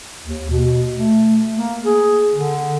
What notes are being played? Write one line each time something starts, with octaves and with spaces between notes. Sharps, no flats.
D#2
B2
A3
A#3
G#4
D3